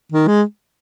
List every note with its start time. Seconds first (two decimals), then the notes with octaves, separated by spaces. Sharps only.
0.12 D#3
0.28 G#3